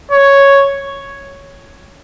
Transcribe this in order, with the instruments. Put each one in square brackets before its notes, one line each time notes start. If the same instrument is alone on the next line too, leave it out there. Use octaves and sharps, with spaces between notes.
[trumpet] C#5